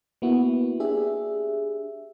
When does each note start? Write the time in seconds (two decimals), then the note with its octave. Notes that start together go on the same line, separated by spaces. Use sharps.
0.22 A#3 B3 E4 F#4
0.80 D4 G4 G#4 E5